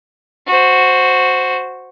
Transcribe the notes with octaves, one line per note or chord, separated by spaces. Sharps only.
F#4 C5